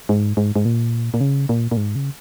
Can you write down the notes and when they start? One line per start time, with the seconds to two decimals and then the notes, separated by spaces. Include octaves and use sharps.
0.09 G#2
0.37 G#2
0.56 G#2
0.65 A#2
1.14 A#2
1.21 C#3
1.49 A#2
1.71 A#2
1.77 G#2
1.95 C#3